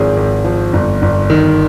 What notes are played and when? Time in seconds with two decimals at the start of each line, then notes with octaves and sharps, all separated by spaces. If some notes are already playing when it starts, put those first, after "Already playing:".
Already playing: G#1 F3 G#4
0.17 G#1
0.44 F3
0.73 G1
1.02 G1
1.30 D#3